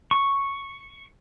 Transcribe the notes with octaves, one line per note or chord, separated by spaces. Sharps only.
C#6